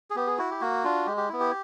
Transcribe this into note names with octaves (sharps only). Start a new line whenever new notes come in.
G#4
B3 G4
G#4
E4 F#4
G4
A#3 F#4
D4 F4
G#3 G4
G4
B3 E4
G4